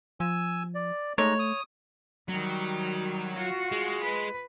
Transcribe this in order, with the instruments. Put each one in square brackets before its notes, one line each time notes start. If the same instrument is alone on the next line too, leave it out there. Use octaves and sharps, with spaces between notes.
[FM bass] F3 [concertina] G#5 E6
[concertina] D5
[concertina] G#3 D#4 A#5 [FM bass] A3 [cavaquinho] C#5
[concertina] D#6
[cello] D#3 G3 [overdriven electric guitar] F#3
[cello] F4 F#4
[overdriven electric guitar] G#3
[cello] B4